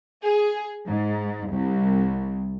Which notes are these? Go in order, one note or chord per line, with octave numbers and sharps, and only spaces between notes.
G#4
G#2
C2